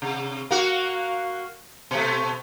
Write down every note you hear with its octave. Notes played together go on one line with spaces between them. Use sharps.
C3
A#3 F#4
B2 A3